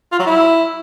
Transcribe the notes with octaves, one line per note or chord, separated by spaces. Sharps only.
F4
F#3
E4